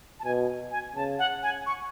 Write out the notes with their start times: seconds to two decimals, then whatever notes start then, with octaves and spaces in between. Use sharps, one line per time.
0.20 A5
0.25 B2 G#5
0.71 G#5
0.96 C#3 A5
1.19 F#5
1.43 G#5
1.66 C#6